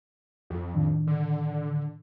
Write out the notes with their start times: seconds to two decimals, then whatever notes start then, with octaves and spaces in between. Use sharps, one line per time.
0.50 F2
0.74 A2 D#3 D4
1.07 D3